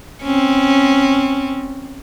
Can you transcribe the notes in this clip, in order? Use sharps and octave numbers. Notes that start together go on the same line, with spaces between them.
C4 C#4